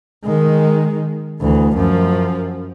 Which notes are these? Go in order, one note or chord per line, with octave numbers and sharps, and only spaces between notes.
D#3 G#3
D2 E3
F#2 F3